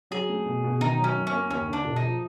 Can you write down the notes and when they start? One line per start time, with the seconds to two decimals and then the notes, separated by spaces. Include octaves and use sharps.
0.11 F#3 G#4
0.29 A3
0.46 B2
0.64 B2
0.81 D#3 D#4
0.98 F#3
1.04 C#4
1.15 F#2
1.27 C#4
1.32 A#3
1.50 D#2 C#4
1.68 D3
1.73 D4
1.85 E1
1.96 D#4
2.03 F3